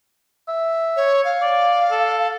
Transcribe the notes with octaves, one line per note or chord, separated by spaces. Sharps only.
E5
C#5
F5
D5
A4